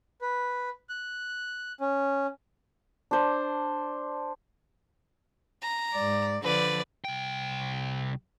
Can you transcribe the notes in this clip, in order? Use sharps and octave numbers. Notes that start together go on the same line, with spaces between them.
B4
F#6
C#4
D4 C5
A#5
G#2 D5
D3 F3 B4 D5
C2 G5